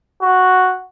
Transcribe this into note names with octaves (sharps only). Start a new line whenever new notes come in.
F#4